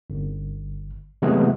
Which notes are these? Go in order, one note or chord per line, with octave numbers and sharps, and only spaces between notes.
G1
C3 E3 F#3 G#3 A3 B3